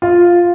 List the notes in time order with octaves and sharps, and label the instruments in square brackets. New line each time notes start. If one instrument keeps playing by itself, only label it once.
[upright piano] F4